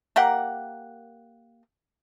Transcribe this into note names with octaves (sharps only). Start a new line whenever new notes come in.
A#3 G4 A#4 F#5